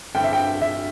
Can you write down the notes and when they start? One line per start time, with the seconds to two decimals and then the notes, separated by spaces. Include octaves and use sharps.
0.15 G2 D3 C4 E4 G5
0.24 E5
0.33 G5
0.62 E5